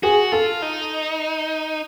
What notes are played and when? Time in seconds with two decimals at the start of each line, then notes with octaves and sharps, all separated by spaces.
0.03 F#4 G#4
0.32 F4 A4
0.62 D#4